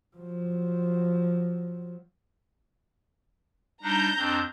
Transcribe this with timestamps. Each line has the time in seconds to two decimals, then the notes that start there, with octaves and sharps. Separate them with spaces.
0.16 F3 F#3
3.83 G3 D4 D#4 A#5 G6
4.17 F2 C4 D4